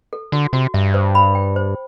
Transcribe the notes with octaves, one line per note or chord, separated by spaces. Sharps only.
A4
D3 F#4
C3 F#4
G2 E5
C5
B5
G5
C5